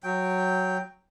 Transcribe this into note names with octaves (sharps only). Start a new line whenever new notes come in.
F#3 G5